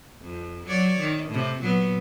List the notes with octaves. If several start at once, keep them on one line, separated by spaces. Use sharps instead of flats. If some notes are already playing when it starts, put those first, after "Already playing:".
F2
F#3 C#5 D5
D#3
A2 C3
A#2 F#3 B3